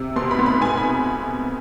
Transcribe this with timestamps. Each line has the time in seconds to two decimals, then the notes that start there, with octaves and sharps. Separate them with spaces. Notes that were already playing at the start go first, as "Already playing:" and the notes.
Already playing: C3
0.16 B2 C6
0.31 B5
0.39 B3
0.46 B5
0.61 B3 G#5
0.77 B5